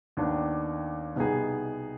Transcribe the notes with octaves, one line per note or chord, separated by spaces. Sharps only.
D#2 D#3 B3 D4
C2 B2 B3 D#4 G#4